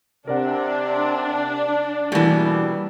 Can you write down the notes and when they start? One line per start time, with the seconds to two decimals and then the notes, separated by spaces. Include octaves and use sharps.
0.27 C3 D4 A#4 D5 F#5
2.12 B2 E3 G3 A3 A#3